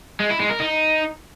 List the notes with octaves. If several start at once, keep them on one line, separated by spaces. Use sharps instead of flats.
G#3
E4
G#3
A#4
D#4